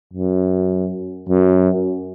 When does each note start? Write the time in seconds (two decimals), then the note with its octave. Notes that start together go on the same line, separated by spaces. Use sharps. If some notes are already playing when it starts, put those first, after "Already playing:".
0.13 F#2
1.29 F#2